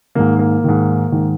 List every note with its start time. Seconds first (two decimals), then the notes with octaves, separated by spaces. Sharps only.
0.15 G#2 D#3 A#3
0.39 A#3
0.64 G#2 D#3
1.12 G#2 D#3